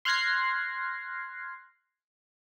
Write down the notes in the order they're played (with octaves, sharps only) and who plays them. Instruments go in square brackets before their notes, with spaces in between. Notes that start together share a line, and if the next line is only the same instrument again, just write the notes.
[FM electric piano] C6 F6 F#6 G#6 A#6 C7